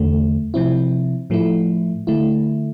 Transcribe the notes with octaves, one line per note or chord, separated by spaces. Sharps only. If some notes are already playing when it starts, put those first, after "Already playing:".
Already playing: E2 D3 A3
C3 F3 C4 E4
A2 F3 A3 E4
D3 A3 E4